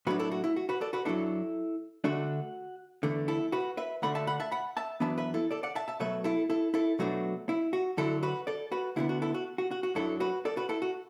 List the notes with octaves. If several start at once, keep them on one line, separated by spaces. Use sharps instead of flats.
A2 F#3 A3 D4 F#4 B4
E4 A4
F#4
E4
F#4
F#4 B4
A4 D5
F#4 B4
F#2 F#3 B3 D4 E4 A4
D2 D3 A3 D4 F#4
E2 D3 A3
E4 A4
F#4 B4
B4 E5
D2 D3 A3 D4 F#5 B5
E5 A5
F#5 B5
E5 A5
F#5 B5
E5 A5
F#2 E3 B3 D4 E5 A5
B4 E5
E4 A4
A4 D5
D5 F#5
E5 A5
E5 A5
B2 F#3 A3 B4 E5
E4 A4
E4 A4
E4 A4
B2 F#3 A3 D4 F#4
E4
F#4
F#2 D3 F#3 D4 E4 A4
F#4 B4
A4 D5
F#4 B4
D2 D3 B3 E4
F#4
E4 A4
F#4
F#4
F#4
F#4
F#2 F#3 D4 E4 A4
F#4 B4
A4 D5
F#4 B4
E4 A4
F#4